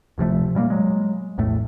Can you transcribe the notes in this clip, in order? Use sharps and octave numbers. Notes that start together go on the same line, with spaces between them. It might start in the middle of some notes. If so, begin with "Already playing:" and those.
D1 C3 F3 A3
A#2 G3 G#3 A#3
F#3 G#3
A#1 E2 A2 A3